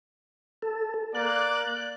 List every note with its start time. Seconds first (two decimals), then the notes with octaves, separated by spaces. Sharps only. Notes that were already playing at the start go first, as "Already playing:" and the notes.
0.62 A4
1.15 A#3 D5 F#6